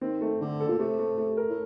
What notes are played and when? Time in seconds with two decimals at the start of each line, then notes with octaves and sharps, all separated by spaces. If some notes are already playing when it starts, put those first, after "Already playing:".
0.01 D#3 C4
0.21 A3
0.41 D3 A3
0.60 A4
0.68 A#2
0.79 C3 A3
0.99 A3
1.18 A3
1.37 A#4
1.49 A2